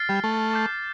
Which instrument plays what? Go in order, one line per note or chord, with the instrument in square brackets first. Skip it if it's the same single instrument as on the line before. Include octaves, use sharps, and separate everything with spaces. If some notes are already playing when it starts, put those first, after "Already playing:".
Already playing: [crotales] F6 A6 C7
[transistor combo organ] G3
A3
[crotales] D6 G6 C7